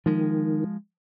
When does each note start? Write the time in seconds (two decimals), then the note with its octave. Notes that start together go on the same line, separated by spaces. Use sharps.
0.06 D#3 F3 G#3